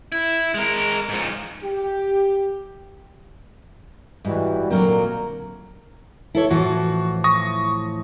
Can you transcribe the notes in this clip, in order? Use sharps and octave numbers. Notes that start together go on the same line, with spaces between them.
E4
G#3 A#4
G#2 F3
G4
G#2 E3 G3 F#4
A#2 D3 F#3 C4 A#4
E4 A4 C#5
A2 E3 F3 F#4
C#6 D#6 A#6